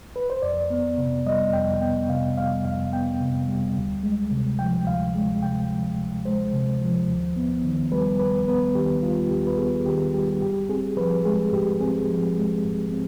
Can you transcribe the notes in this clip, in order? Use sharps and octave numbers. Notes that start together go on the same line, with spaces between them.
B4
C5
F2 D5
B3
C3
G3 D#5
F2 G5
B3 G5
C3 F5
G3 F5
F2 F5
B3 G5
C3
G3
D2
G#3
C3
F3 G5
D2 F5
G#3
C3 G5
F3
D2
G#3 C5
C3
F3
D#2
B3
D#3
G3 B4
D#2 B4
B3 B4
D#3 G4
G3 F4
D#2 G4
B4
B3 G#4
D#3 G4
G3 G4
G#2 G4
C4 G#4
F3 B4
G#3 G#4
G#2 G4
C4 G#4
F3
G#3
G#2
C4